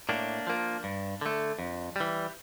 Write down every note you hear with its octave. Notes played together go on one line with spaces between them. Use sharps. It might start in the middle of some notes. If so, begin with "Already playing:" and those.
A2 A#3 D4
F3 A#3
G2
D3 A3
F2
E3 G3